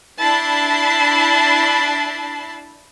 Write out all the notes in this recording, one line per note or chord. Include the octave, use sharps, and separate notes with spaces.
D4 E4 A5 B5 C7